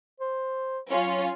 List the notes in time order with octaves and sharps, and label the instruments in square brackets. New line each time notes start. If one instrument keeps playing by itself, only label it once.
[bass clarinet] C5
[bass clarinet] F#3 [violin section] C#4 F4 C#5